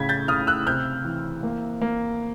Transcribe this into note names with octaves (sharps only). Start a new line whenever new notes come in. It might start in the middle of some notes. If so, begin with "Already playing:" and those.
Already playing: A2 C#3 G#6 B6
G6 A6
C#3 D#6 F6
E6 F#6
C3 F6 G6
E3
A#3
A#3